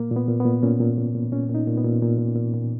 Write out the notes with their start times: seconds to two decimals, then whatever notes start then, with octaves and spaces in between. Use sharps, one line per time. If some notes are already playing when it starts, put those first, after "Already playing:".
Already playing: A#2 A#3
0.12 A#2 B3
0.28 A#2
0.40 B3
0.45 A#2
0.63 A#2 C#4
0.80 A#2
0.98 A#2
1.15 A#2
1.32 A#2 C#4
1.49 A#2
1.55 D#4
1.67 A#2
1.78 B3
1.84 A#2
2.02 A#2
2.18 A#2
2.36 A#2
2.54 A#2